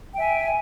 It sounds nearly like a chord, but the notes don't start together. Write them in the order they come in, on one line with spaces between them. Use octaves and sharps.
G5 E5 G#5